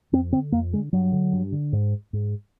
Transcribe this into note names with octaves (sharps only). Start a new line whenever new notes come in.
F2 C4
D3 C4
F2 A#3
D3 G#3
G2 F#3
D3
G2
D3
G#2
G#2